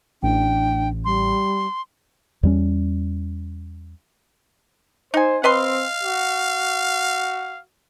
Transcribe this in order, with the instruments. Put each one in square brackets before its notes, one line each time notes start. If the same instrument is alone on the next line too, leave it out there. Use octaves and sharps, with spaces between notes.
[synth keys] A1 [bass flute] D4 [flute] G5
[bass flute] G3 [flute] C6
[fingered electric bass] E2 G3 C#4
[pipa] D#4 G#5 [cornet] C5
[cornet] C4 [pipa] B4 D#5 C6 [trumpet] F5
[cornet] F#4